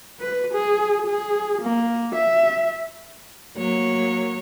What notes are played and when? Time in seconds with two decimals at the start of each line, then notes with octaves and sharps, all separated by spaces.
0.21 B4
0.54 G#4
1.06 G#4
1.62 A#3
2.15 E5
3.57 F#3 A#3 C#5